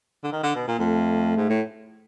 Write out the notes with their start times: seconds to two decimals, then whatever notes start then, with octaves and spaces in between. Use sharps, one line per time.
0.24 D3
0.33 D#3
0.43 D3
0.55 B2
0.68 A#2
0.79 F2 A3
1.37 G#2
1.49 A2